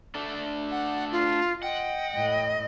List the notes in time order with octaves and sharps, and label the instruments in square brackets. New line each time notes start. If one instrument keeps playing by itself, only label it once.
[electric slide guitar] A3 D4 A4
[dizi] F#5
F4
[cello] D#5 [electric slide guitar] F#5 [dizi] G5
[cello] A2 D#5